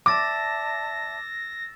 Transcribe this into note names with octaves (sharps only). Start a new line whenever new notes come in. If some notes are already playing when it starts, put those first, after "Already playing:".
D5 E5 A5 D6 E6 A6 A#6 E7